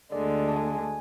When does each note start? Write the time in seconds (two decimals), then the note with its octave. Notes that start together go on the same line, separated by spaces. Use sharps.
0.11 D2 D3 G#3 D5
0.48 A5
0.56 G#5
0.78 G#5